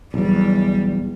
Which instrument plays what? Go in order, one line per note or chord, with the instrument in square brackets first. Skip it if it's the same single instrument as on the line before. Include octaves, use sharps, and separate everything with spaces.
[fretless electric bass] B1 E2 [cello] G3